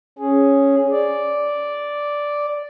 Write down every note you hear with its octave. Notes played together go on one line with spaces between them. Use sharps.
C#4 G#4
D5